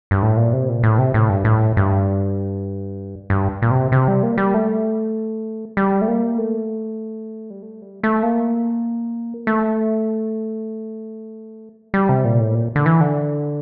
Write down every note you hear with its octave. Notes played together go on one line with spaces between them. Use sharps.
G2
A2
A#2
C3
A#2
A2
C3
A2
G2
A2
G2
G2
A#2
C3
C3
G3
A#3
G3
A3
G3
A3
A#3
A3
G3
A3
G3
A3
A#3
A3
G3
C3
A#2
A2
A#2
D3
E3
D3